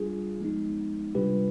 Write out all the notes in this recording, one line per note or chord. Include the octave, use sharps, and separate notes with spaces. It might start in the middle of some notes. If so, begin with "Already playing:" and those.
Already playing: G3 D4 F4 G#4
F3 G#3 B3 D#4
C3 G3 D4 F4 G4 B4